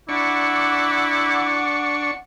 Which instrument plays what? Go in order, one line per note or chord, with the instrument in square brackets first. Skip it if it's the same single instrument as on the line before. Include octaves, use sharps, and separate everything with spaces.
[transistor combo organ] D4 C#6 [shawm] E4 [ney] F#5 [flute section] D6